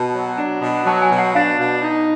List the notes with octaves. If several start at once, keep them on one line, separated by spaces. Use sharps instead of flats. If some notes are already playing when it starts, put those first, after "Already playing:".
Already playing: B2 A5
F#3
D4
B2
F#3 A5
G#5
B2
F#5
D4 F5
B2
D#4